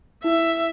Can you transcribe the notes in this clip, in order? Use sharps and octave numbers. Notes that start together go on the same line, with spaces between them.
E4 E5